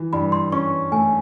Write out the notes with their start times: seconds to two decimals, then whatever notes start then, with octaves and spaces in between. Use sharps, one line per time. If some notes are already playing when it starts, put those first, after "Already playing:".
Already playing: E3
0.13 G2 B5
0.32 C6
0.52 C#4 C#6
0.92 A3 G#5